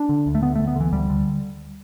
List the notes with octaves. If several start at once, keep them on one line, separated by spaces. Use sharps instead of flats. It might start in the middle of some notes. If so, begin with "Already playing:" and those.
Already playing: D4
D3
D2
A3
D3 B3
A3
D2
B3
D3 E3
D2 G3
D3